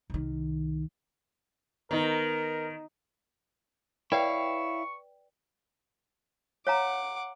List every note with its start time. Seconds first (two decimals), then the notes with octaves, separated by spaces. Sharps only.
0.10 C2 D#3
1.91 D#3 B3 D#4 A#4
4.12 E4 B4 C#5 D5 F5 G5 C#6
6.67 C#5 F5 F#5 A#5 D6